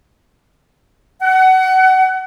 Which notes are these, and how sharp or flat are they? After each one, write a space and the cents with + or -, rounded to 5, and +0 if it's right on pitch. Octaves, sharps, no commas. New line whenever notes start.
F#5 +25